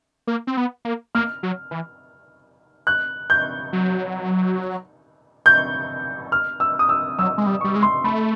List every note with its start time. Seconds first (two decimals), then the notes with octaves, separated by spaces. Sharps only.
0.27 A#3
0.47 C4
0.57 B3
0.85 A#3
1.15 A#3 F6
1.43 F#3
1.71 E3
2.87 F#6
3.30 G6
3.73 F#3
5.46 G6
6.32 F6
6.60 E6
6.79 D#6
6.89 E6
7.19 F#3 E6
7.38 G#3
7.47 G3
7.61 G3 C#6
7.76 G#3
7.83 C6
8.04 A3 B5